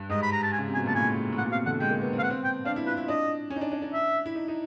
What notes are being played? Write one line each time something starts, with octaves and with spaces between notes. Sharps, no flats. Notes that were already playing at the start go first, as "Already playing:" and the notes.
Already playing: G2
G#2 D#5
B5
A#5
A5
G#5
C#3
C3
G#5
B2
A#2 A5
A2 G#5
A2
A#2 F#5
B2
C3 F5
D3 F#5
G#3 G5
A#3
B3
C4
F5
B3 F#5
C4
G5
D4 F5
E4
F4 B4
E4
D4 D#5
C#4
D#4
D4
D4
D4
E5
E4
D#4
D#4